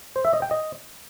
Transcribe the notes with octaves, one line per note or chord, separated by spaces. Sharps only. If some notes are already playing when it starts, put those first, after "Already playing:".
C5
E5
D#5
G5
D#5